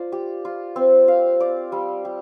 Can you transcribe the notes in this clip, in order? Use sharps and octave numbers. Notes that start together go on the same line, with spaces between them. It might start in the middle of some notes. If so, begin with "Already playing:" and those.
Already playing: F4 C5 D5
G4
F4
C4
F5
D5
G3
G4